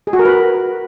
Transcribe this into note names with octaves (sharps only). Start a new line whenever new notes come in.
G#4
F#4
A#4
B4